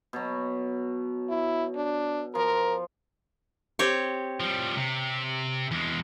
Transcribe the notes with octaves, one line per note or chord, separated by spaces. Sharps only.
B2 F#3
E4
D4
F3 A#4
C4 G4 C#5
F3 G3
C3
E2 G#3